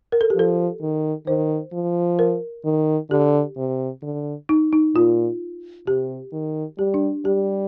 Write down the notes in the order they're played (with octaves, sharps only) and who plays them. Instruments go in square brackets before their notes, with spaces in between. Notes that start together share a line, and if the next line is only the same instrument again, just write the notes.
[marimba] A#4
A4
G4
[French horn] F3 [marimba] A4
[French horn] D#3
[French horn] D#3 [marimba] C5
[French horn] F3
[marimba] A#4
[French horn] D#3
[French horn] D3 [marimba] G4
[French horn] C3
D3
[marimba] D#4
D#4
[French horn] A#2 [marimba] F4
[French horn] C3 [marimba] G4
[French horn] D#3
[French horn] G3 [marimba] G4
[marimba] D4
[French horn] G3 [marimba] G4